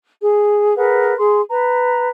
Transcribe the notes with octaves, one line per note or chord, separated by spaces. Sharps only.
G#4
G#4 A#4 B4 F#5
G#4 C6
B4 A#5